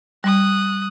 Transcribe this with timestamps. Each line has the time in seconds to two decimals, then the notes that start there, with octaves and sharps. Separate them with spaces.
0.24 G3 D#6 F#6